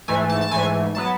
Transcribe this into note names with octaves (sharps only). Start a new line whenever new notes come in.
G#2 E3 A3 G#5
A5
A5
G#2 E3 A3 G#5
F#3 B3 A5